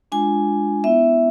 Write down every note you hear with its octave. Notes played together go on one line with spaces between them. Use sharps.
G#3 D4 F4 G#5
B3 E4 E5